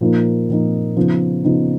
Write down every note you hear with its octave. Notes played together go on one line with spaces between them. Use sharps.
A#2 F3 A#3 D#4
A#2 F3 A#3 D#4
C#3 F3 B3 D#4
C#3 F3 B3 D#4